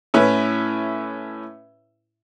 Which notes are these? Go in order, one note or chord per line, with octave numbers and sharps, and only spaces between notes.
A2 C#4 E4 B4